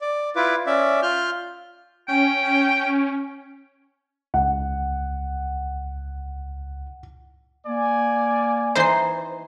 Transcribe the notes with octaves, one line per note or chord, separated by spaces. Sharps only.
D5
E4 F4 B4 D6
C#4 D5 E5
F4 F6 G6
C#4 G5
C#2 F#5
A#3 D5 G#5
E3 D#4 C5 D#5 C7